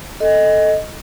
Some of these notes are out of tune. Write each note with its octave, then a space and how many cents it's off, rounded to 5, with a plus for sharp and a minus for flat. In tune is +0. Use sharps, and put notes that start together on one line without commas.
A4 +0 D#5 +5